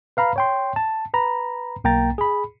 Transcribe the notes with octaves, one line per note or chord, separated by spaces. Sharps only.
B4 F5 A#5 B5
C#5 G5 C6
A5
B4 A#5 B5
B1 A#3 G5 A#5 A6
G#4 B5